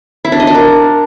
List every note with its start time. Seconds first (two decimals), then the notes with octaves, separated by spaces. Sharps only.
0.25 E4
0.32 D4
0.40 D#5
0.47 D4
0.55 A#4